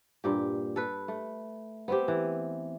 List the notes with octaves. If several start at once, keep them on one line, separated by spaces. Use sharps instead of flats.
G2 A#2 G4
A4 B4
A3
B3 C4 G4
E3